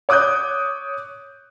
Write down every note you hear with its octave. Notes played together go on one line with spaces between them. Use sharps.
C#5 D6 D#6 F#6 G6